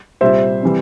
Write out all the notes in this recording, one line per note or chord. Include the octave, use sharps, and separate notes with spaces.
C2 A#2 G3 C5 E5
C3 E3 G3